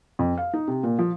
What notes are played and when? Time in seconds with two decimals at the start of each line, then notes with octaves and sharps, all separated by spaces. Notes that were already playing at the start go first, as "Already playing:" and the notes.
0.19 F2
0.37 F5
0.54 D#4
0.68 C3
0.83 A#2
0.99 F3